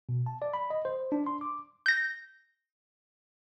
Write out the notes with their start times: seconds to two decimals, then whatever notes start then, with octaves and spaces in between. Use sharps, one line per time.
0.09 B2
0.26 A5
0.42 D5
0.54 B5
0.70 D#5
0.85 C5
1.12 D4
1.26 C6
1.41 D6
1.86 G6 A#6